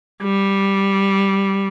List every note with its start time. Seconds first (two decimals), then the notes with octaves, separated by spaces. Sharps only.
0.23 G3